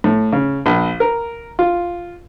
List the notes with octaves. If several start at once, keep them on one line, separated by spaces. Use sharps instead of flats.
A2
C#3
A#1
A#4
F4